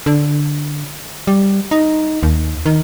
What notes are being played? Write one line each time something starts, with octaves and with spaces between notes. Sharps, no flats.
D3
G3
D#4
D#2
D#3